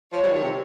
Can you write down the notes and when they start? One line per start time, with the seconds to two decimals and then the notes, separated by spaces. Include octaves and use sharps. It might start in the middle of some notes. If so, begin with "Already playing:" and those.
0.12 F3 C#5
0.23 G3
0.28 F3
0.33 D#3
0.42 C3